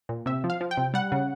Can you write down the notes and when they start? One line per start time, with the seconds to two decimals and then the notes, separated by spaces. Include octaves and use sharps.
0.09 A#2
0.26 C3 E5
0.44 F3
0.50 F5
0.61 F3
0.71 G5
0.77 C3
0.94 G3 F#5
1.12 C#3